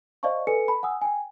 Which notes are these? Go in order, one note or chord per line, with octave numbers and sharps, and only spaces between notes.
C5 D5 D#5 F5 A5 C#6
A4 B4 G#5 C#7
A5 B5
F#5 G#5 D#6 E6
G5 G#5